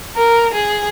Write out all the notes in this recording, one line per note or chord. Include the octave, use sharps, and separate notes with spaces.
A#4
G#4